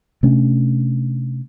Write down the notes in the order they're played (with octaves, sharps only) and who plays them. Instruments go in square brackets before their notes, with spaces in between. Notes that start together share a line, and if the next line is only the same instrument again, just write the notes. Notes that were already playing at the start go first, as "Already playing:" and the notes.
[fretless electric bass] C3 A3 C#4 D4